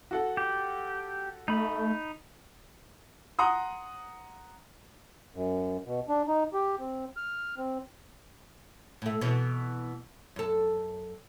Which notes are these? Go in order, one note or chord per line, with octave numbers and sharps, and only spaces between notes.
F#4 A4 F#5
G4
A3 D#4 B5
F#5 A#5 C6 D#6
F#2
B2
D4
D#4
G4
C4
F6
C4
A2 A3
B2 E3
F#2 A4